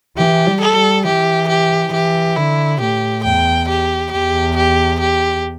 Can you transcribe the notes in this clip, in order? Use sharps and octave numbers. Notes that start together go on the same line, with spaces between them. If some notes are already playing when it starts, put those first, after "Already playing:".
E3 G4
G3
A4
G3
E3 G4
G4
E3 G4
D3 E4
A2 G4
E2 G5
G4
E2 G4
G4
G4